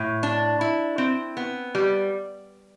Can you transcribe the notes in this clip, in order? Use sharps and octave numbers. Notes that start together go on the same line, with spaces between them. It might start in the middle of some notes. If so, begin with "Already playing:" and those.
Already playing: A2
D4
E4
C4
B3
G3